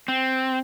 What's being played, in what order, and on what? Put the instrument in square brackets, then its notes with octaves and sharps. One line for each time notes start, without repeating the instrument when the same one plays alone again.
[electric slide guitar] C4